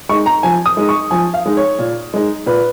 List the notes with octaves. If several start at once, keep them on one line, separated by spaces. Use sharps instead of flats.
G#3 D#4 C#6
A#5
F3 G#5
D#6
G#3 D#4
C#6
F3 G#5
F5
G#3 D#4
C#5
A#2
G#3 D#4
A#2 B4